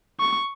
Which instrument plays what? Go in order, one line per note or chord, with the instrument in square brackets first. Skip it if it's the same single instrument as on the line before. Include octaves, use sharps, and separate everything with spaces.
[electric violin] C#6